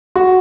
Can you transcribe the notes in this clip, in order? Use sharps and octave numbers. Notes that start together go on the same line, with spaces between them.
F#4